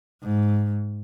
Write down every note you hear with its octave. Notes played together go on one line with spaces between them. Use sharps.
G#2